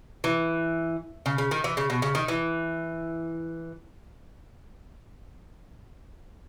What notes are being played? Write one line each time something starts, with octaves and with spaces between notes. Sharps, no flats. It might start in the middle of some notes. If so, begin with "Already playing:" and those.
E3
C#3
C#3
D#3
E3
C#3
B2
C#3
D#3
E3